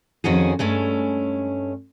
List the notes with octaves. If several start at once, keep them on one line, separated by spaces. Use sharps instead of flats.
F2 D#3 C#4 F#4 G#4
G2 G#3 A3 C#4